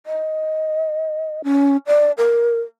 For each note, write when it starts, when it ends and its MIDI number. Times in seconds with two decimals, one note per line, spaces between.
0.06 1.42 75
1.44 1.77 61
1.87 2.12 74
2.18 2.60 70